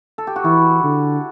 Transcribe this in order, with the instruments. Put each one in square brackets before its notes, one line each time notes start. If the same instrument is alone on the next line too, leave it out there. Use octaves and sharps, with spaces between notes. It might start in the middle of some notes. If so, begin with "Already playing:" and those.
[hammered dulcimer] A4
G4
F#4
[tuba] E3 [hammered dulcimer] E4
[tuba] D3